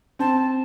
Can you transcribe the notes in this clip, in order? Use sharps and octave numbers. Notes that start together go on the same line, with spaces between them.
C4 A5